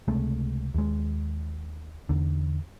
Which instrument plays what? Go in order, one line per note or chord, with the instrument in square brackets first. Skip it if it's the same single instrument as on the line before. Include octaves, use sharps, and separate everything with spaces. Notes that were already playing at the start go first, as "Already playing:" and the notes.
[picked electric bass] C#2 C3 G#3 A3
D#2 G#3
E2 D3